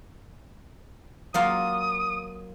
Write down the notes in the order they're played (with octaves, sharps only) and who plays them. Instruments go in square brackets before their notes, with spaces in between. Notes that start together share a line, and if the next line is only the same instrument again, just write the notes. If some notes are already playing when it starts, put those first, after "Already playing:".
[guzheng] F#3 A#3 F4 [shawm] D#6